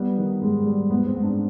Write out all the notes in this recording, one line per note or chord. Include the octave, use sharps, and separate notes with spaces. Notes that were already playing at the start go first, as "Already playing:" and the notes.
Already playing: G3 B3
D#3
G#2 G#3
G3
G#2 B3
C4
G#2
D4